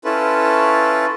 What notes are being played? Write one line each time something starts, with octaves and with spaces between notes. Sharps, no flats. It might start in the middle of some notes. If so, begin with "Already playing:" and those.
C#4 E4 F4 A4 B4